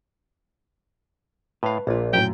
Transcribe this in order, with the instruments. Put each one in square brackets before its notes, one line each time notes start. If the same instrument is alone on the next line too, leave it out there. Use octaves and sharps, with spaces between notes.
[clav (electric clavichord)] A2 F5 [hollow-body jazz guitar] B4
[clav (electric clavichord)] A#1 [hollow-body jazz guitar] A#2 F4
[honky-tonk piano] F#2 A2 [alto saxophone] G5